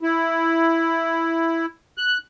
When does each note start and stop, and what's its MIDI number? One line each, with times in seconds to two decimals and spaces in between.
0.01 1.66 64
1.98 2.18 90